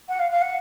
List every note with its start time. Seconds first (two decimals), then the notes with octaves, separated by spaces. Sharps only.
0.08 F#5
0.19 F5
0.30 F5
0.41 F#5